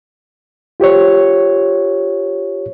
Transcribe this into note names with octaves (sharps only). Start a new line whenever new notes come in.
F4 G4 C5 C#5